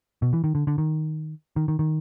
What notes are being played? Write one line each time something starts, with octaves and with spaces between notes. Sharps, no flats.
B2
E3
D#3
D3
D3
D#3
D#3
D#3
D#3